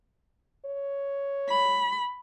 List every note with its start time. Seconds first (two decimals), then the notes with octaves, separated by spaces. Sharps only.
0.65 C#5
1.50 B5